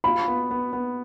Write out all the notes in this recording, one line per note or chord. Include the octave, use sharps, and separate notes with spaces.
F4 B5
B3
B3
B3